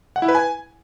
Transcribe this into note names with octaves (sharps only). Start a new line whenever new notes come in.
F#5
E4
B4
G#5